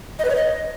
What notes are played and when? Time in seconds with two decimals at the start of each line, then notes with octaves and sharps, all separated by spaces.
0.19 D#5
0.25 B4
0.30 C#5
0.36 D#5